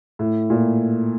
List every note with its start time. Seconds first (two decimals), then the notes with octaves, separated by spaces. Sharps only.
0.19 A2
0.50 A#2